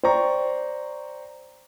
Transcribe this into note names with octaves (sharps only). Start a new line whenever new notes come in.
C5 D5 G5 A#5 C#6